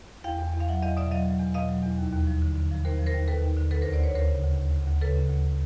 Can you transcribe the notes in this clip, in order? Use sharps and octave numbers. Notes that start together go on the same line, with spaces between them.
E2 F5 G5
E2
E2
F5
F#3 E5 F#5
E2 D#5 F5
B2 D5 E5
F#3 D#5 F5
F#3
E2
B2 D#5 F5
F#3
E2
D#2
D#2
F3
D3
D3
F3
D#2 A#4 C5
F3
A#4 C5
D#2
D#2 A4 B4
D#2
D3
D2 A4 B4
A#4 C5
D2
C5 D5
D2 B4 C#5
D2 A#4 C5
C#3
D2
D2
D2
D2
C#3 A4 B4
C#3
D2